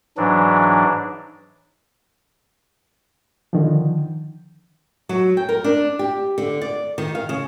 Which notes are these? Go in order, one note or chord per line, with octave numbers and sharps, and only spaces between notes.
G#2 E3 F#3 D4
D3 D#3 F3
F#3
G5
A#4
D4
G4
D3
D5
D#3
F5
C#3